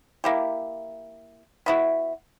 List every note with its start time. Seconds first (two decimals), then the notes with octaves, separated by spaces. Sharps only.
0.24 A#3 E4 G4
1.66 B3 E4 F#4